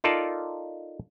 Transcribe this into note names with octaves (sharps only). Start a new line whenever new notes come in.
D#4 F4 A4 A#4 D5 A5